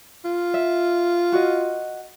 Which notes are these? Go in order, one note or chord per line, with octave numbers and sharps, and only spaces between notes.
F4
E5
F#4 D#5